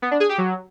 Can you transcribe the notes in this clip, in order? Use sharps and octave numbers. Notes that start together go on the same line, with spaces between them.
B3
D4
G#4
G4
F#3